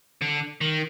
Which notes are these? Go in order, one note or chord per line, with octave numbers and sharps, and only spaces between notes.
D3
D#3